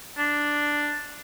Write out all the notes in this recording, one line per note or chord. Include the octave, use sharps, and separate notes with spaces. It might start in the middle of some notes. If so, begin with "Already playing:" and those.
D4